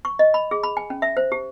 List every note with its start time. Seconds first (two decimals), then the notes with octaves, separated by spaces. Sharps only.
0.05 C#6
0.19 D#5
0.34 B5
0.51 G#4
0.63 B5
0.77 G#5
0.90 C#4
1.02 E5
1.17 C5
1.32 G4